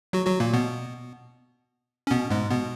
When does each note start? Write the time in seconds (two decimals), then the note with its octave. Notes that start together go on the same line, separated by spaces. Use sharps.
0.13 F#3 F#4
0.26 F#3 F#4
0.40 A#2 A#3
0.53 B2 B3
2.07 C#4
2.11 B2 B3
2.30 G#2 G#3
2.51 B2 B3